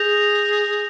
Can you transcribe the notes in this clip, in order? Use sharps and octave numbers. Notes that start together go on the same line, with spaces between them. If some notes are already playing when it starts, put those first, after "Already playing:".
Already playing: G#4 G6 A#6 F7